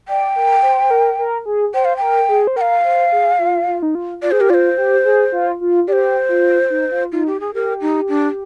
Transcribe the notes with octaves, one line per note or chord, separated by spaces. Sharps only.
D5 G5
A#4
C5
C5
A#4
A#4
G#4
C5 G5
F5
A#4 G5
G#4
C5
A#4 F5 G5
C5
G#4
F4
F4
D#4
F4
F4 D5
G#4 C5
G4 A#4
F4 C5 D5
G4
G#4
F4
F4
G4 C5 D5
F4
D#4
F4
D#4 F4
G4
G#4
G4 A#4
D#4
D4